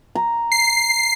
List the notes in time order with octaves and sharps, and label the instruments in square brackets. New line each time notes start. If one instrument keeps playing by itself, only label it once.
[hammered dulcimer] A#5
[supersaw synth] C7